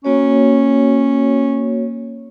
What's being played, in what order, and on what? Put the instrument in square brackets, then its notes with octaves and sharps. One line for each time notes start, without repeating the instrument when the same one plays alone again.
[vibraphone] A#3 F#4 C#5 [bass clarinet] C#4